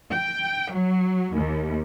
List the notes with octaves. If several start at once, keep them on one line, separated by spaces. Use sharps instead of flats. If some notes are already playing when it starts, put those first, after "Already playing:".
G5
F#3
D#2